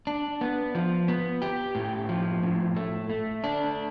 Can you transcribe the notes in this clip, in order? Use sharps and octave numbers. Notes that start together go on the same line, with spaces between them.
D4
B3
F3
B3
G4
A2
F3
A2
A3
A3
D4